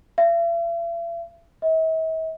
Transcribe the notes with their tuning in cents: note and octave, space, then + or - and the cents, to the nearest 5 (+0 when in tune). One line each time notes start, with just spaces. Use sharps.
E5 +45
E5 -45